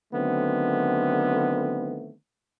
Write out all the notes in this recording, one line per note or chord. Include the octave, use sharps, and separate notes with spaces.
D3 D#3 F#3 A3 B3 C4